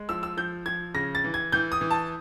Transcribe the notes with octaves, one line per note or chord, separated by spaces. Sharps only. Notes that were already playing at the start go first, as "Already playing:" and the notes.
Already playing: G#3
F3 E6
E6
F3 G6
F3 G#6
C#3 A#6
A6
E3
G#6
E3 G6
D#6
E3
A5